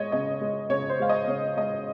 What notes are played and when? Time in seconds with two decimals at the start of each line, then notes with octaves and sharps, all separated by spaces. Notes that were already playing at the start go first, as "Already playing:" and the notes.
Already playing: G#3 C#5 D#5
0.12 C#3 D#5
0.41 G#3
0.70 C#3 C#5
0.89 C5
0.99 G#3 F5
1.09 D#5
1.28 C#3 C#5
1.56 G#3 D#5